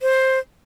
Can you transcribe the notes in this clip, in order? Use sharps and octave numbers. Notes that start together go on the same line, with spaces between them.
C5